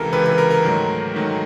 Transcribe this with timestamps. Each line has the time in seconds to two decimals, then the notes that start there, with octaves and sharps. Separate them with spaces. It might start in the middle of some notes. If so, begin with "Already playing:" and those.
Already playing: C#2 C3 E3 A4 A#4
0.12 C#2 C3 E3 B4
0.26 B4
0.38 A#4
0.51 A#4
0.63 G#2 D#3 F#3 A3
1.15 G#2 D#3 F#3 A3